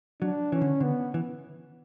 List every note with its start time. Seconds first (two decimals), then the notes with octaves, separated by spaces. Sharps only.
0.21 F#3 D4
0.52 E3 C#4
0.61 D3
0.80 D3 B3
1.14 E3